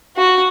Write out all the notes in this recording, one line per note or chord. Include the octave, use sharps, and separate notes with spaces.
F#4